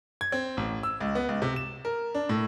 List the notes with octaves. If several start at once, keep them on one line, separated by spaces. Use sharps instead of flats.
G#6
C4
A1
E6
C#2
B3
C#2
C3
E7
A#4
D4
A2